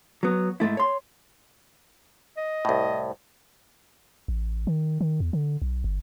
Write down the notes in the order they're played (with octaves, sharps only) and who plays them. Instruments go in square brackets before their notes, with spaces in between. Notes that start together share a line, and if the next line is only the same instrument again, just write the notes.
[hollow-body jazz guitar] F#3 B3
G#2 A3 E4
C#5 C6
[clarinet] D#5
[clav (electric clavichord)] C2 A2
[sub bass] A1
D#3
D#3
E2
D3
B1
G1